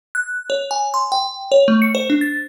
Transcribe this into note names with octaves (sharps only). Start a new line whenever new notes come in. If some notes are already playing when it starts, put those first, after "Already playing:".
F#6
C#5
G#5
C6
G5
C#5
A3
C#7
C5
D4
A6